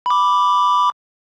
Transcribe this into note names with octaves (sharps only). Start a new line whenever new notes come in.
B5 D6